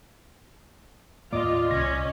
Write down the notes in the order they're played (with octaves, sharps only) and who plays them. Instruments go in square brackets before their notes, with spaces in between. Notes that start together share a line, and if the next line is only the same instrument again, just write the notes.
[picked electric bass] D#2 A2 A#3 [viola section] F4 [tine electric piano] D5 [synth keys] D#5 D6
[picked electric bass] C2 [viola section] C#4 [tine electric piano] A#6